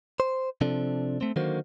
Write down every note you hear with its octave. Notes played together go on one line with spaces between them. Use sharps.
C5
C3 F3 C4 D4 A4
A3 C4
D3 D#3 F#3 A#3 F#4 C5